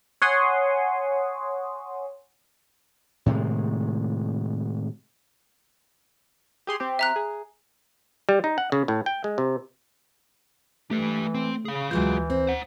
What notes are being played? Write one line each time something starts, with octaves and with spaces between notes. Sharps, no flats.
C#5 F#5 G#5 C6 C#6 D#6
A2 C3 D#3 G#3
G4 G#4 C6
C4 G4
E5 A#5 F#6
G#4
G3
D#4
F#5
C#3
A2
G5
G#3
C3
E3 A3 G4 B4
C4
C#3 G#4 F5
D2 E3 F#3 G#3 F4 G6
C4
C5 F#5